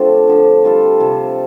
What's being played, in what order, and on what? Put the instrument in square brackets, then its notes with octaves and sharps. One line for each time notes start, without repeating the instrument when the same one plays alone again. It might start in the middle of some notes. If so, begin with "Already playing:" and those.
Already playing: [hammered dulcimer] D3 F3 A3 C4 D4 F4 A4
D3 F3 D4
G3 F4 A4
C3 F3 D4 A4